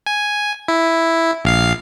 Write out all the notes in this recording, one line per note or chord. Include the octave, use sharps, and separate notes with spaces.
G#5
E4
A#1 F5 C7